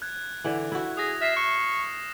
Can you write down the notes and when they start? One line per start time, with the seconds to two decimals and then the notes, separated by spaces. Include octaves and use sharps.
0.02 F#6 G#6
0.44 D3 E3
0.72 E4 F#4
0.97 G#4 D#6 A#6
1.21 E5 F6 C7 E7
1.37 C#6